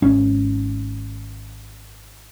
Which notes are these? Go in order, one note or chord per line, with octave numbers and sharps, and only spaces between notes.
G#1 C#4